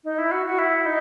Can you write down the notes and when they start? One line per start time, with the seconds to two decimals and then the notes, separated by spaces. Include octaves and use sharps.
0.04 D#4
0.18 E4
0.31 F#4
0.46 F#4
0.58 E4
0.85 D#4